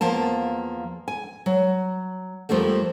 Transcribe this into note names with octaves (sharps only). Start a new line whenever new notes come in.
E2 F3 A#3 A5
G#5
F#3
F2 F3 G3 A3 A#3